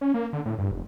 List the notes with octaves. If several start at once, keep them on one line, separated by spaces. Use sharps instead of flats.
C#4
A#3
D3
A2
G2
F1